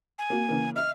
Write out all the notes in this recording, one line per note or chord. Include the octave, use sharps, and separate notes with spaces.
G#5
A#3 F#4
C#3 E3 A#3
D#5 E5 F6